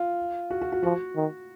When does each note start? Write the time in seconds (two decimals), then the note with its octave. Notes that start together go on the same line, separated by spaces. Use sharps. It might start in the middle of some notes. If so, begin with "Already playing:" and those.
Already playing: F4
0.51 F#4
0.62 F#4
0.72 F#4
0.83 F3 F#4
1.16 D#3